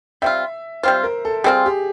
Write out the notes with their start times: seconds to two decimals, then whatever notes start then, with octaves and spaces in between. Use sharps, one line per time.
0.22 G3 C4 F4 E5
0.83 G3 C4 F4 C5
1.04 A#4
1.25 A4
1.44 G3 C4 F4 G#4
1.66 G4